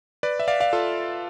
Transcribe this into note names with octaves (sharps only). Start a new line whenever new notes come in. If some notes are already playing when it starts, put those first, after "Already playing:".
B4 D5
E5
D5 F5
D5 F5
F4 A4